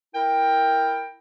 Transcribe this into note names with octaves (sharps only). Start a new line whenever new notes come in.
E4 A#4 G5